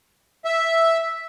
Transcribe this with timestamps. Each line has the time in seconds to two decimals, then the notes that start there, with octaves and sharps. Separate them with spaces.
0.45 E5